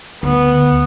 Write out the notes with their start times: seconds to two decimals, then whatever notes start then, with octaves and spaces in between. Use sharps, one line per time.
0.23 D2 B3